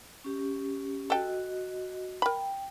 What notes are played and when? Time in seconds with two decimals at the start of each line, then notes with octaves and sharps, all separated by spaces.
0.24 C#4 G4
1.10 F#4 A4 D#5 G5
2.22 A#4 G5 B5